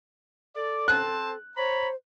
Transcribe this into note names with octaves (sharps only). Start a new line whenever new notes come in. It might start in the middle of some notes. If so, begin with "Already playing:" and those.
A4 D5
C4 C5 A5 F#6
C5 C#5 A#5 B5